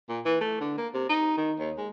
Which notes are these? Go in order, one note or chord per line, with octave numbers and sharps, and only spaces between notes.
A#2
E3
A3
D3
A#3
C3
D#4
D#3
D#2
G#3